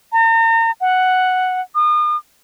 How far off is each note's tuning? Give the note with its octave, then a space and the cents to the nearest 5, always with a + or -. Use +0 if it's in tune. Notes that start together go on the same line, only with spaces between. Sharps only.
A#5 -40
F#5 +0
D#6 -40